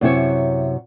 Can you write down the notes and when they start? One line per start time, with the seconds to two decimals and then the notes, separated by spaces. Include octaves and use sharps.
0.01 F#2 C3 E4 C#5